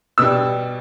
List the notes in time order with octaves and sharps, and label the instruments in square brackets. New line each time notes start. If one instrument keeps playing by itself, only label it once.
[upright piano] B2 G3 E6